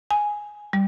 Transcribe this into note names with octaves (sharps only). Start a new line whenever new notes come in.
G#5
G3